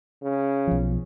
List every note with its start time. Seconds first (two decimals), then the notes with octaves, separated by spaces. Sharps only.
0.22 C#3
0.67 B1 F3